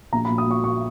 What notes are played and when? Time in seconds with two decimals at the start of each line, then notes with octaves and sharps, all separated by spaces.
0.13 A#1 A#5
0.25 B5
0.30 A#1
0.38 D#6
0.47 A#2 C#6
0.64 A#2 C#6